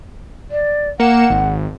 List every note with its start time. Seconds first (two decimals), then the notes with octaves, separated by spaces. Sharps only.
0.51 D5
1.00 A#3 F#5 C#7 E7
1.30 G#1